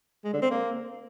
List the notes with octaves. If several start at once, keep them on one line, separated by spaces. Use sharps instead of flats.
G#3
D3
C4
A#3